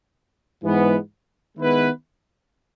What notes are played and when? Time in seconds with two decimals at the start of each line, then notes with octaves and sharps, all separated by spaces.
0.64 G#2 E3 G#3 B3
1.57 D#3 G#3 B3 E4 B4